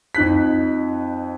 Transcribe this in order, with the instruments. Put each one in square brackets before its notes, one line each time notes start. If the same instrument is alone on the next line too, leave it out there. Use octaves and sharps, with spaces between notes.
[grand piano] F2 D#4 F#6 B6